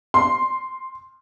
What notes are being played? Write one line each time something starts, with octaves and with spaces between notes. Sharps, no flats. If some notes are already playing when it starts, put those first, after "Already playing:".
C6